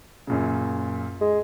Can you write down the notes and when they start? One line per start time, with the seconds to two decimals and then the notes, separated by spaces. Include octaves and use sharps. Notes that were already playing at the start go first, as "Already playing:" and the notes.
0.27 F#2 A#2 C#3
1.21 G#3